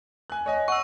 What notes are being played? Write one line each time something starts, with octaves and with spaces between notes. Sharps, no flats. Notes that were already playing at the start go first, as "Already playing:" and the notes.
G#5 F#6
C#5 D#5 G#5
F#5 C#6 E6